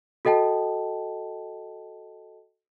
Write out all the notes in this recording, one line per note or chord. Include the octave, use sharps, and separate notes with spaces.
F#4 A4 D#5 G5 A5